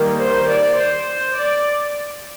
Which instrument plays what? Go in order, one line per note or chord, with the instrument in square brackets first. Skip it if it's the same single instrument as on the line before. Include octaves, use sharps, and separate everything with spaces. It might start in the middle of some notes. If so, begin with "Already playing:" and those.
Already playing: [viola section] D#3 G3 A#3
C5
D5
C5
D5